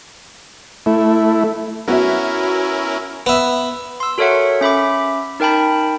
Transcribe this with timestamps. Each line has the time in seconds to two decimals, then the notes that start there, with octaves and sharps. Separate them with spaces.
0.86 A3 E4
1.88 B3 C#4 E4 F#4 A#4 E5
3.26 B3 E5
4.00 C6 E6
4.18 F#4 A4 A#4 C#5 E5 F#5
4.61 C#4 E5 B5 D6
5.40 D#4 A#4 G5 A5 B5